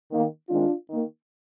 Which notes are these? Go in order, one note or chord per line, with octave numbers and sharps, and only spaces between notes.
D#3 A#3
D#3 G#3 C4 D4 F4
D#3 A#3